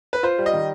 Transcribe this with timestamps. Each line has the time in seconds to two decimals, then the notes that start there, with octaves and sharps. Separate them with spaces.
0.13 B4
0.23 F4 C5
0.38 G3
0.46 D#5
0.53 D#3